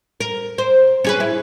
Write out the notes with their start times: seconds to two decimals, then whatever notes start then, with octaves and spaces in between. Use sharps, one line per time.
0.20 A#4
0.58 C5
1.04 C#4 G#4 B4
1.20 E4